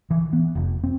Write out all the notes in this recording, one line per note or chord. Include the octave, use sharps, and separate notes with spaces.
E3
B3
F1
C4